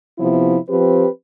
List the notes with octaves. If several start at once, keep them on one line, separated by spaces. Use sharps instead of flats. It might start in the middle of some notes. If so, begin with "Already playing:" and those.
C3 F3 B3 E4
F3 C4 G4 B4